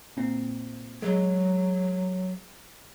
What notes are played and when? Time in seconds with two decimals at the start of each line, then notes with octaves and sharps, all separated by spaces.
0.17 A#2 C4
1.02 F#3 G#3